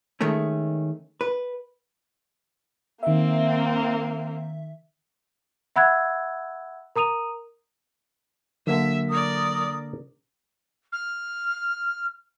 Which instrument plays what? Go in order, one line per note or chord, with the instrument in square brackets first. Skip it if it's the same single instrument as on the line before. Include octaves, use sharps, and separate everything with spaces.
[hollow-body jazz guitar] D#3 G#3 A3 C#4
B4
[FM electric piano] D#3 E5 [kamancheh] A#3 C4
[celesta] E5 F#5 B5 E6 F#6 G#6
A#4 A#5 D#6 D#7 F7
[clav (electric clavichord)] D3 A#3 [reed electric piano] F#3 [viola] E5
[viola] A#4 D5 [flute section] D#6
[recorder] F6